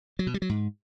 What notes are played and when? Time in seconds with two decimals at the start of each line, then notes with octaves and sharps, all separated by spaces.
0.19 F#3
0.27 B2
0.34 G3
0.42 F#3
0.49 G#2